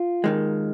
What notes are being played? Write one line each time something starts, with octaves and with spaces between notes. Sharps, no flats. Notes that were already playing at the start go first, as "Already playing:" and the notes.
Already playing: F4
D#2 D#3 G#3